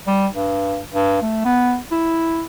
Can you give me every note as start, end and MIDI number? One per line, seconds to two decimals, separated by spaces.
0.07 0.27 55
0.34 0.79 43
0.93 1.20 43
1.22 1.41 57
1.45 1.76 59
1.91 2.45 64